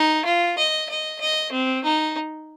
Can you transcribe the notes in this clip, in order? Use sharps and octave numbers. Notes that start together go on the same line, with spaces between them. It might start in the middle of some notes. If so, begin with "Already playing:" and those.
Already playing: D#4
F4
D#5
D#5
D#5
C4
D#4